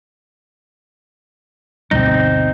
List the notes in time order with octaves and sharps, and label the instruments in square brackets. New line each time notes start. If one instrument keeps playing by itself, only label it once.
[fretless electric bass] G1 D2 B2 [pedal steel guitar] C4 D#4